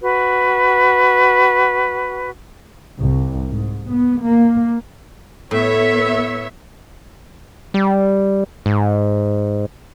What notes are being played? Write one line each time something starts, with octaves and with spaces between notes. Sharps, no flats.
F#4 B4
C2
G#2
B3
A#3
A2 B3 C#5 E5
G3
G#2